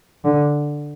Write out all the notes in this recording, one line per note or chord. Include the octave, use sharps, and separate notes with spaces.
D3